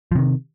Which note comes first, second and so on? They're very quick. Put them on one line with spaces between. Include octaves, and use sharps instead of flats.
F3 C3 D#3